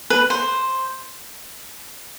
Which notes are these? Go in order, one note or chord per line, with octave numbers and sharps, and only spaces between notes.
B4
C5